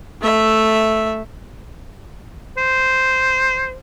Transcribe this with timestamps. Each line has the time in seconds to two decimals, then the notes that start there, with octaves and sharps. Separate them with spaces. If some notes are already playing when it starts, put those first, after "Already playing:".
0.22 A3 E5
2.57 C5